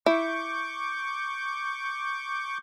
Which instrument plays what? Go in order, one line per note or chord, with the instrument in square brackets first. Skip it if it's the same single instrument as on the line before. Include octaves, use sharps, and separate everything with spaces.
[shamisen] E4 [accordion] C#6 D6 G6